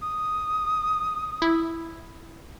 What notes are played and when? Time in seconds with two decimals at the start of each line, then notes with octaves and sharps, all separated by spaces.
0.02 D#6
1.42 E4